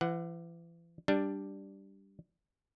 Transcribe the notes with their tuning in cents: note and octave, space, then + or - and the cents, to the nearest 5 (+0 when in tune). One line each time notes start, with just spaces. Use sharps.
E3 +40 F#5 +0
G3 +0 D4 +0